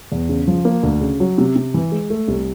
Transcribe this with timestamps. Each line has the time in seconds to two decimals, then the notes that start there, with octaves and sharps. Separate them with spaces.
0.12 E2
0.29 C#3
0.47 F3
0.65 A#3
0.83 D2
1.01 C#3
1.20 F#3
1.38 C3
1.56 C3
1.74 E3
1.92 G#3
2.10 A3
2.28 C2